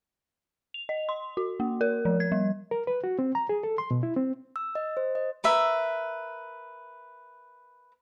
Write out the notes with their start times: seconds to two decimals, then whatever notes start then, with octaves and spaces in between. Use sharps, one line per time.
0.74 F7
0.89 D#5
1.09 C6
1.37 F#4
1.60 A#3
1.81 A#4
2.05 F3
2.20 G#6
2.32 G3
2.71 A#4
2.87 B4
3.04 F#4
3.19 C4
3.35 A#5
3.49 G#4
3.63 A4
3.78 C6
3.91 B2
4.03 E4
4.16 C4
4.56 E6
4.75 D#5
4.97 C5
5.15 D#5
5.44 A#4 B4 E5